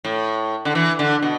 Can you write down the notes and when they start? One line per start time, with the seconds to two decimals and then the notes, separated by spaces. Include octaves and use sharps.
0.05 A2
0.65 D3
0.75 E3
0.99 D3
1.23 B2